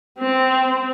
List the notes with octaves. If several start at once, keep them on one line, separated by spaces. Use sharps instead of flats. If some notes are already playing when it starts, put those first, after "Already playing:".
C4